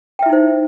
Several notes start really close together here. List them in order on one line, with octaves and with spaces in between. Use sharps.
G5 E5 E4 D#4 C5